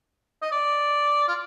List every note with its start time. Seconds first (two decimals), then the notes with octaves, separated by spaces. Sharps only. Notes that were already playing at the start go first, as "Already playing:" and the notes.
0.42 D#5
0.52 D5
1.28 F4